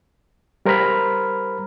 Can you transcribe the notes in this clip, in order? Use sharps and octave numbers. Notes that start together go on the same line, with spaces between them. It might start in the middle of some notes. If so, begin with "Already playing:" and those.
G3 A#4 C5 A#5 B5 F6